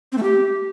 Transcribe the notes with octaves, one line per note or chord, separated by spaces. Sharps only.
C4
A3
G4